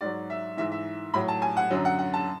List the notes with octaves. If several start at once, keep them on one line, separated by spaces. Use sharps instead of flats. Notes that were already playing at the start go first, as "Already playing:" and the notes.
G#2 F#3 D5
E5
G#2 E3 E5
E5
A2 F#3 B5
A5
G#5
F#5
F#2 D3 F#3
F#5
F#5
A5